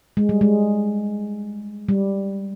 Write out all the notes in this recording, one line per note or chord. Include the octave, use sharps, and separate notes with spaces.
G#3
G3
G#3
G3